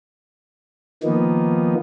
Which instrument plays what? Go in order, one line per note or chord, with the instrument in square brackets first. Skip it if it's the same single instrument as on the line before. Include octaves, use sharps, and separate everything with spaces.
[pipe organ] D#3 F3 A#3 B3 D#4